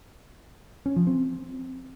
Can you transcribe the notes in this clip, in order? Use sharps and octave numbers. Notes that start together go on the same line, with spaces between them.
C#4
F3
C4